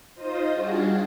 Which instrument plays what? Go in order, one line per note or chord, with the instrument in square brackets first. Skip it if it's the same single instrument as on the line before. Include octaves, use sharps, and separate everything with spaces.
[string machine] D#4 F4 C5 D#5 D#6
G3 D4 F4 F#4 G#4